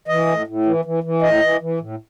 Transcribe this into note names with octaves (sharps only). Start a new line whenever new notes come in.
E3 D#5
A2
A2
E3
E3
E3
A2 D#5
E3
E3
A2